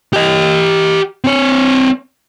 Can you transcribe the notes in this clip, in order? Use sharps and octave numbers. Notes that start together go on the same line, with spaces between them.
G4 D#5
C4 C#5